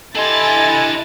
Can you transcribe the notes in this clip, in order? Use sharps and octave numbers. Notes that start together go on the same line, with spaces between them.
D4 E4 G4 A4 D#5 G#5 C6 A6